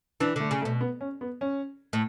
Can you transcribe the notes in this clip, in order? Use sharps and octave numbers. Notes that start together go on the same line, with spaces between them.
E3 D4
D3 A3
C#3
A3
B2
B3
C#4
B3
C#4
A2